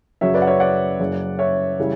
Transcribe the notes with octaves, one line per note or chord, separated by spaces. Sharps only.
F#2 C#3 F#3 C#5 E5
B4 D5
F#5
C#5 E5
D5 F#5
F#1 F#2 C#3
C#5 E5
C#3 E3 G3